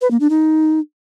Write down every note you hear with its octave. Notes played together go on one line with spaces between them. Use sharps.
B4
A#3
D4
D#4